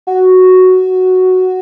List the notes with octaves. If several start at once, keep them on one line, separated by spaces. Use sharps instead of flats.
F#4